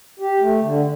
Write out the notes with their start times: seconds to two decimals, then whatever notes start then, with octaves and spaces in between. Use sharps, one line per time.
0.19 G4
0.40 A3
0.61 D3